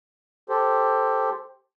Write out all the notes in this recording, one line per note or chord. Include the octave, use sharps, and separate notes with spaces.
G4 A4 C5